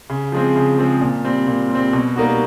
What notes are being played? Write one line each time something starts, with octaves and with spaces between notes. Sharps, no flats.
C#3
F3 G#3 C4
C#3
F3 G#3 C4
A#2
G3 C4
A#2
G3 C4
B2
G3 A#3 D#4 F#4